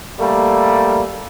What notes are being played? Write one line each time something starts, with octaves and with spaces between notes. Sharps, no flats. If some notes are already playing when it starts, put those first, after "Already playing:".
G3 A3 A#3